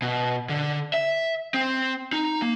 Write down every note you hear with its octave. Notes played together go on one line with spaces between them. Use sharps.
B2
D3
E5
C4
D#4
A#3